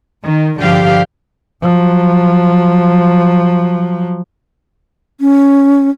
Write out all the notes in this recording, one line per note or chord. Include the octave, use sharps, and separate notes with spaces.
D#3
G2 D3 F3 G4 F5
F3 F#3
C#4